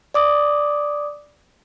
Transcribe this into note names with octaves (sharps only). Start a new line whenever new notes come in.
D5 D6 D#6